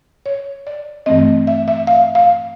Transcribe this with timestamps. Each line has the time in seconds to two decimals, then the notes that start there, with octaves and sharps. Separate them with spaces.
0.26 C#5
0.67 D5
1.06 G2 E3 A3 C4 D#5
1.47 E5
1.68 E5
1.87 F5
2.15 F5